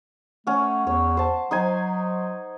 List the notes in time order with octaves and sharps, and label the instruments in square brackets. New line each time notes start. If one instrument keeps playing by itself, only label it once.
[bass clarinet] A3 [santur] C#4 F#5
[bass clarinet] E2 [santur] C#5
[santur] C5 A5
[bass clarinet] F#3 [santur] D#4 C5 G#5